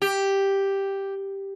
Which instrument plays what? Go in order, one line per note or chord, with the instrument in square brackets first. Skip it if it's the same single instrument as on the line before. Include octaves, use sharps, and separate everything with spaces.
[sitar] G4